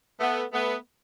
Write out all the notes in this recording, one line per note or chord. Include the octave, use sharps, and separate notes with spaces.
A3 B3
A3 B3